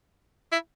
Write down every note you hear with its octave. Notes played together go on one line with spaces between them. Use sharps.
E4